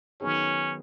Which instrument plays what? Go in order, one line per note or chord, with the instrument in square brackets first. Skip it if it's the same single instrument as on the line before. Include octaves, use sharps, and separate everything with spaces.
[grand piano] D#3 F#3 B3 D#4 G#4 [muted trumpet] C#4